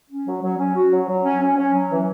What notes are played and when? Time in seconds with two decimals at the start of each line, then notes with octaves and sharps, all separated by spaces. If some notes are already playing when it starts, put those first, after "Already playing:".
0.09 C#4
0.26 F#3
0.41 F#3
0.58 C#4
0.75 F#4
0.91 F#3
1.07 F#3
1.24 C#4
1.41 C#4
1.56 C#4
1.73 F#3
1.89 E3